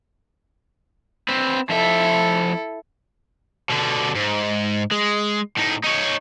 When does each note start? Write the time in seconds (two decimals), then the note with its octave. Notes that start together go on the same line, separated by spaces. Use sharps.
1.29 C4 B4
1.70 F2 E4 A4 E5
3.70 B2 D3
4.16 G#2
4.91 G#3
5.57 A2 D#4
5.84 D#4 C#5